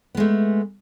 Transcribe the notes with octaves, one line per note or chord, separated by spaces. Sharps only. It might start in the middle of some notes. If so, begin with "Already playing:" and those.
G#3 A3 B3